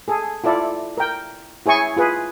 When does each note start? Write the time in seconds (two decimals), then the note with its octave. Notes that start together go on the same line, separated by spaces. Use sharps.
0.08 G#4 A4
0.44 E4 F4 A4 D5
0.97 A#4 G5
1.66 E4 G#4 C#5 G#5 C#6
1.97 F4 G#4 B4